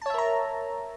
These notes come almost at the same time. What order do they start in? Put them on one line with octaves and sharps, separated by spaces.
A5 C#5 E5 A#4 A#5